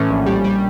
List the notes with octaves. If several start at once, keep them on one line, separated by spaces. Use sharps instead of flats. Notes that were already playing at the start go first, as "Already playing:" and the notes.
Already playing: A2 E3 C#4
A#1
G3
G3